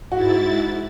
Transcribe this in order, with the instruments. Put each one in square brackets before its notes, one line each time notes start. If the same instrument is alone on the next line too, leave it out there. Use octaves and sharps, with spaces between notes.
[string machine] G#2 E4 A6 [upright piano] F#4